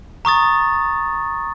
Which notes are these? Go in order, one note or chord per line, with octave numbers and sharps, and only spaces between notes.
A#5 C#6 D#6 A6